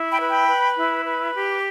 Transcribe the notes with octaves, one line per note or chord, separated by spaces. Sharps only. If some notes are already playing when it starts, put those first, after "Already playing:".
Already playing: E4
G5 B5
B4
G5 B5
B4
E4
B4
G4
D6